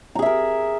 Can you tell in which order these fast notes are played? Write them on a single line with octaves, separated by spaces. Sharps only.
A#5 G#4 E5 A#4